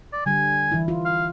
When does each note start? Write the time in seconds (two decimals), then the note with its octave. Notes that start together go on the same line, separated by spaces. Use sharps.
0.13 D5
0.26 D3 G3 G#5
0.72 E3 E4
0.88 F4
1.05 F5